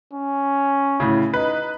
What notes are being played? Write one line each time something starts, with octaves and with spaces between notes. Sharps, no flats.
C#4
A2 C#3
D#4 B4